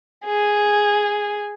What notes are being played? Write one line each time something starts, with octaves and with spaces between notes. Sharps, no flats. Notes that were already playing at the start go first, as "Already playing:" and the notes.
G#4